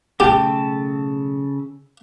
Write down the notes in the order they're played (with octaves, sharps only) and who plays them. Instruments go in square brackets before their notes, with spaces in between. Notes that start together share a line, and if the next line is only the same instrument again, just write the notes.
[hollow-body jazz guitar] B1 A3 G5 [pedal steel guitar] C#3 A4 A5 [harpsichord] G4